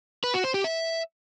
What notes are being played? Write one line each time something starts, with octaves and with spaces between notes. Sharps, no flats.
B4
F#4
C5
G4
E5